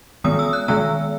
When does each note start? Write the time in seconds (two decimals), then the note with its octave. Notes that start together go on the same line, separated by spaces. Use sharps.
0.24 D#3 G#3 B3 D#6
0.39 E6
0.53 F#6
0.68 D#3 G#3 B3 E6